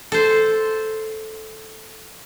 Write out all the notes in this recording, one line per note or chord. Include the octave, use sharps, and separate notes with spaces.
A4 C5